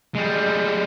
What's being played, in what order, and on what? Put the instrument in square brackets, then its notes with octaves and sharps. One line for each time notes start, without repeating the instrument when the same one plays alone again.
[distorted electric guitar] G3 G#3